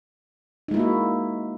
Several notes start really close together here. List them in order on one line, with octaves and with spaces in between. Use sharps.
D#4 G#3 E4 A#3 F#4